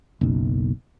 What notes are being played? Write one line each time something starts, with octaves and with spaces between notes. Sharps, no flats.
F#1 B1